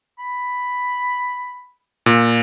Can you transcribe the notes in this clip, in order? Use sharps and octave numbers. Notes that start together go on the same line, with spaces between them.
B5
A#2